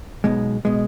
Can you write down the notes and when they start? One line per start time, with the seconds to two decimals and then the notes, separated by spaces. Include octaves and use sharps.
0.24 B1 B2 G#3
0.65 B2 G#3